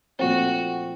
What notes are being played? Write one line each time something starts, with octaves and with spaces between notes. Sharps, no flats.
A#2 F3 A3 C4 F#4